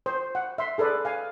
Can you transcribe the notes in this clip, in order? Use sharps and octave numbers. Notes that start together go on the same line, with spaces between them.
C5
F#5
E5 C6
G#4 A4 B4 D5
F5 G#5